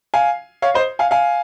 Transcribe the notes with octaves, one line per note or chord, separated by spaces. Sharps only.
F5 G#5
C#5 F5
C5 D#5
F5 G#5
F5 G#5